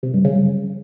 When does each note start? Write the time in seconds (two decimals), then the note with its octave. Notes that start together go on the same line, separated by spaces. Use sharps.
0.03 C3
0.14 G2
0.25 C#3
0.35 G2